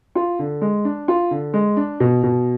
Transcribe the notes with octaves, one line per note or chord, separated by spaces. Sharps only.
F4
D3
G#3
D4
F4
D3
G#3
D4
B2
B2